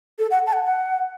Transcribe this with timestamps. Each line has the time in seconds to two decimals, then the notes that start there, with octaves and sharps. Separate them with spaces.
0.19 A4
0.31 F#5
0.47 A5
0.53 F#5
0.65 F#5